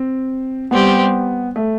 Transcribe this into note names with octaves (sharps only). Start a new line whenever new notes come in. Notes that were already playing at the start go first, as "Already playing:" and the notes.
Already playing: C4
G3 B3 C4 G4
A3